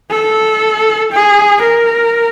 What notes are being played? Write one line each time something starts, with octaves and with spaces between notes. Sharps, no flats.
A4
G#4
A#4